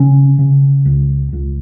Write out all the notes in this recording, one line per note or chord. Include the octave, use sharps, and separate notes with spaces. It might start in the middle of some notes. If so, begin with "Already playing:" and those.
Already playing: C#3 C#4
C#3
C#2
C#2